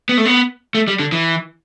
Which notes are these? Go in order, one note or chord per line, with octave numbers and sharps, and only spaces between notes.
B3
A3
B3
A3
G3
D3
E3